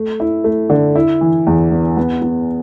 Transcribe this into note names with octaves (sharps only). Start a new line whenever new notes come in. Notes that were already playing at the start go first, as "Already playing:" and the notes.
Already playing: A3
E4
A3
D3
E4
E3
E2
B3
B3
B3